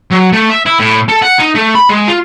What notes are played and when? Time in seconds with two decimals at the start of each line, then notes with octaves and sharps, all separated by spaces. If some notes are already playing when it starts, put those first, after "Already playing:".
0.12 F#3
0.33 A3
0.50 E5
0.66 E4
0.79 A2
1.08 A4
1.22 F#5
1.39 D#4
1.55 A3
1.75 B5
1.89 G#3
2.08 F4